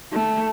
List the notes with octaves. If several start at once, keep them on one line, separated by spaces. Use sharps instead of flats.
A3